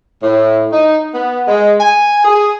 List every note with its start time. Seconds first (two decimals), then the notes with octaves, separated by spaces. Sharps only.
0.23 A2
0.72 D#4
1.14 B3
1.48 G#3
1.80 G#5
2.25 G#4